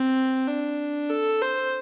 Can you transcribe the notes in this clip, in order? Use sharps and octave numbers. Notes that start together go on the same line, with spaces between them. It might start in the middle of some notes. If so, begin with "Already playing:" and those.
Already playing: C4
D4
A4
C5